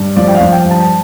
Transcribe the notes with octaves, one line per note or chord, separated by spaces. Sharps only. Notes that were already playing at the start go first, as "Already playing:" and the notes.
Already playing: G2
F3 D5
G5
F5
F3
G5
G2
A5